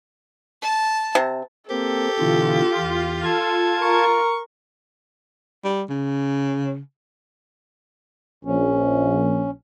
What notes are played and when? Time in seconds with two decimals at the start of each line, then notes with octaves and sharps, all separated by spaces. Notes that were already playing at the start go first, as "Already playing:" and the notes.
0.62 A5
1.15 C3
1.70 A#3 C4 G4 A4
2.19 B2 D3 E3 F4
2.78 E2
3.24 A4 A5 G#6
3.82 A#4 C#6
5.64 G3
5.90 C#3
8.45 A#1 C#4